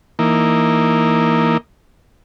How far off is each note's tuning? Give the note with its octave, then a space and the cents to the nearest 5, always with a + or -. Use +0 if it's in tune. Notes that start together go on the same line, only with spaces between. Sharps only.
E3 +0 A#3 +0 D#4 +0